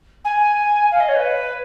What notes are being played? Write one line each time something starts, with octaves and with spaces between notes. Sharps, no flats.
G#5
F5
D#5
C#5
B4